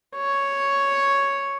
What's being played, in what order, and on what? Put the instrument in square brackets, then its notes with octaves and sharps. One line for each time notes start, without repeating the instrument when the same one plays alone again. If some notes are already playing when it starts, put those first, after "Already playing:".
[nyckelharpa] C#5